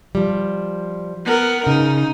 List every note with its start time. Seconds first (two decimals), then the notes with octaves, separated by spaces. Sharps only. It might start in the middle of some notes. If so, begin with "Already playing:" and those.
0.15 F3 G3
1.26 B3 A#4
1.67 C#3 D#4